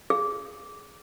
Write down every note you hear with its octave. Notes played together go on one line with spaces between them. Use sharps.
G#4